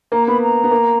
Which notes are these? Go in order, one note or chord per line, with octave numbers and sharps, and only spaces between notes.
A#3 A#5
B3 B5
A#5
B3
A#3